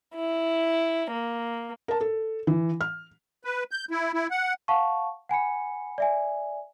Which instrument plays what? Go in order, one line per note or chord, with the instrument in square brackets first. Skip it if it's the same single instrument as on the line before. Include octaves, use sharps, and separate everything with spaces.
[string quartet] E4
A#3
[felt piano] A#4 A5
A4
E3
F6
[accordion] B4
G6
E4
E4
F#5
[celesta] F5 F#5 A5 C#6
F#5 G#5 B5 C#7
D5 E5 G#5